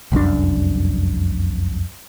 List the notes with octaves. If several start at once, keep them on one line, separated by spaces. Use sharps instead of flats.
F1 C2 F#2 D4